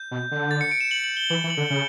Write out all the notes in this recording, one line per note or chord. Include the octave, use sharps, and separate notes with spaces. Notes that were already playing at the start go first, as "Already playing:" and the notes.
Already playing: G6
B2
D3
A6
C#7
D7
E7
F#7
F#7
G7
E3 F#7
E3
F#7
D3
C#3